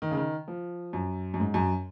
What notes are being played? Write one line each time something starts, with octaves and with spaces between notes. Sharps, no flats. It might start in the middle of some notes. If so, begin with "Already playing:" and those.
D#3
C#3
D#3
F3
F#2
F#2
G#2
F#2